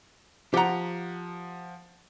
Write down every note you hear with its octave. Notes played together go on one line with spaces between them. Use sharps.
F3 G4 F#5 A#5